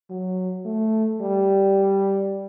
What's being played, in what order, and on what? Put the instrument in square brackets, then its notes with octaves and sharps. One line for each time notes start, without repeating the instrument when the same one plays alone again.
[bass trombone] F#3
A3
G3